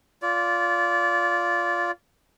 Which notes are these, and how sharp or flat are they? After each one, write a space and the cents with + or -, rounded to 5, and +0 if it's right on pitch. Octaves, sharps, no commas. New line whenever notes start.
F4 +0 D5 -25